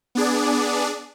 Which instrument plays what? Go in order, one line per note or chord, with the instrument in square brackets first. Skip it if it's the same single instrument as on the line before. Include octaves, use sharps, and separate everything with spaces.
[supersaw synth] B3 D4 G#4 D5